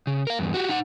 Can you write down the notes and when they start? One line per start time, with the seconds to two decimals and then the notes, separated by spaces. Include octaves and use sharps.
0.07 C#3
0.27 A#4 F5
0.39 E2 G2
0.54 F#4 G4
0.69 D#4 F#5